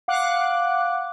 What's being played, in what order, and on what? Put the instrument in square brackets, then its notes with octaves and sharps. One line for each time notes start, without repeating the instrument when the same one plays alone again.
[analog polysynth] F5 F#5 D6 F#6